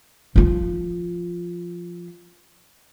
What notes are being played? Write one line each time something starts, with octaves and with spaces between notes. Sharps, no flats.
F3 F4